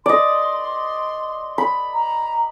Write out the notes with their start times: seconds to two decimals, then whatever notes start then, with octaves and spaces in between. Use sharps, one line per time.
0.06 D5 D#5 C6
1.58 B5
1.94 A#5